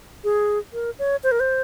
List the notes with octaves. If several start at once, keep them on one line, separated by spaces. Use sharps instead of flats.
G#4
A#4
C#5
C5
A#4
C5